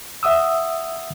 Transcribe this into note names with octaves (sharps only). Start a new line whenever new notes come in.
E5 F#5 D#6 E6